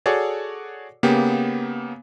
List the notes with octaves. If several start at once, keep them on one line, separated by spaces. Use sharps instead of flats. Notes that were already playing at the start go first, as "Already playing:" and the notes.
F#4 G#4 A4 C#5 D5
C#3 A#3 B3 G4